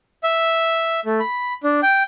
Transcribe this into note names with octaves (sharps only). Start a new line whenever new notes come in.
E5
A3
B5
D4
G5